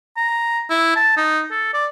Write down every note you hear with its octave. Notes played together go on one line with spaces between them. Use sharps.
A#5
E4
A5
D#4
A4
D5